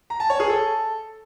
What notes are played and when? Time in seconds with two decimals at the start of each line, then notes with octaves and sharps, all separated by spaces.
0.10 A#5
0.20 A5
0.30 C#5
0.40 G#4
0.49 A4